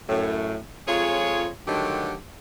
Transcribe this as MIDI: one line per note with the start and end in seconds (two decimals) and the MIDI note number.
0.09 0.58 42
0.09 0.58 45
0.88 1.49 41
0.88 1.49 56
0.88 1.49 65
0.88 1.49 68
0.88 1.49 73
1.67 2.14 43
1.67 2.14 50
1.67 2.14 51
1.67 2.14 54
1.67 2.14 57
1.67 2.14 67